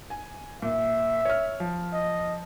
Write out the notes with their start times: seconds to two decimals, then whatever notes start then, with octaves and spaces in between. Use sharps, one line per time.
0.10 G#5
0.62 A#2 E5
1.25 C#5 F6
1.60 F3
1.93 D#5